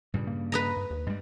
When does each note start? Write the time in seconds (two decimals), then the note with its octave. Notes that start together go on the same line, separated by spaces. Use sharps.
0.14 G2 A#2 C#3 G3
0.27 A#3
0.52 B4 D#5 A#5
0.77 G2
0.91 D#2
1.07 G2 G3 G#3